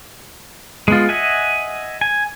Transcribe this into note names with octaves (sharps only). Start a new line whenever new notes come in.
G#3 B3 F4
D#5 E5 F#5 G#5
G#5